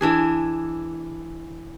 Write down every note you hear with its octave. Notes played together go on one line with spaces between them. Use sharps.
E3 D4 G#4